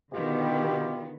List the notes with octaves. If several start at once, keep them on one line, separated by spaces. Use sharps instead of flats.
B2 D3 D#3 B3 F4 G4